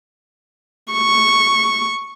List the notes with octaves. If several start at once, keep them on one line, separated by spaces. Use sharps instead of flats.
C#6